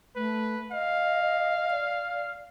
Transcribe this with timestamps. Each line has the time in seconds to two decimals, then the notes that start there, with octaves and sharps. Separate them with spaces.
0.16 A3 B4
0.72 D#5 F5
1.71 D5